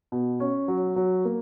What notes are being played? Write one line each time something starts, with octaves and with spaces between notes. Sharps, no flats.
B2
C#4
F#3
F#3
A#3